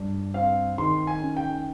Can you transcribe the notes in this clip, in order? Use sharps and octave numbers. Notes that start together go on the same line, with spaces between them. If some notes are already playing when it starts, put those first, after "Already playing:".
Already playing: G2
C4 F5
D#3 C6
G#5
C#4
G5